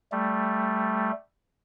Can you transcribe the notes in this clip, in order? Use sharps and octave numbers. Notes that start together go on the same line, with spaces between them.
G3 A3